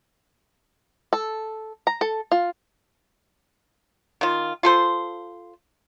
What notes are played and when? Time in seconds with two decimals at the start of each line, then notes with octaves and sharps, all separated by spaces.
1.13 A4
1.87 A#5
2.01 A4
2.32 F4
4.21 D#3 F4
4.63 F4 A4 C5